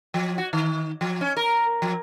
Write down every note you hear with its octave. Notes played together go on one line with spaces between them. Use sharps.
F3
F#4
D#3
F3
C#4
A#4
F3